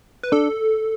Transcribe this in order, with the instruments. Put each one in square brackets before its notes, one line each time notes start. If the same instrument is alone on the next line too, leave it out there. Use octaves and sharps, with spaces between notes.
[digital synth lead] B4
[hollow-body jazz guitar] D4 [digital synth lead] A4